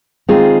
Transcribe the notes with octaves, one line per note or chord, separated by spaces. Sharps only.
D#3 G#3 C4 F4 G#4